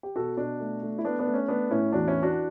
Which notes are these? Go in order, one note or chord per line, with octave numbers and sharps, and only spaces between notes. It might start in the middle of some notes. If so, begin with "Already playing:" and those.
G4
B2 F#4 A4
B2 D4 F#4
A3
A3
E4
A3 B3 D4
B3 D4
A3
C#4
A3 B3 D4
A2 C#4 E4
E2 D4 F#4
C#4 E4
E3
D4 F#4